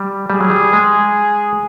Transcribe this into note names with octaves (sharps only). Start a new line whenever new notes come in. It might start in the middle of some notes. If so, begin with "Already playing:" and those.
Already playing: G3
G3 G#4
F#3
G3
G#3